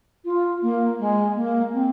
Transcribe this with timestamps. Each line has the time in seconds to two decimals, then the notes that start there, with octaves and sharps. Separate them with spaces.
0.25 F4
0.62 A#3
0.99 G#3
1.35 A#3
1.73 C4